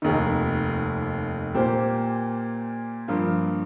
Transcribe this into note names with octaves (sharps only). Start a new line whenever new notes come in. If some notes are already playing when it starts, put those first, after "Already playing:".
F1 D#2 D#3
A#2 A#3 G4 C5
G2 F3 A#3 F4